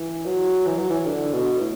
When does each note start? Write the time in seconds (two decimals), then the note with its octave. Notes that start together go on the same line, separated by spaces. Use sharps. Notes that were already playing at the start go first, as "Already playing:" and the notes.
Already playing: E3
0.26 F#3
0.66 E3
0.78 F#3
0.90 E3
1.07 D3
1.33 B2
1.61 A2